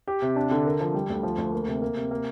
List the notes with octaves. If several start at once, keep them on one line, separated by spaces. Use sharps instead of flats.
G4
C3
D4
D3
A#4
F3
G3
D2
F3
D2
A#3
C3
A#3
C3
A#3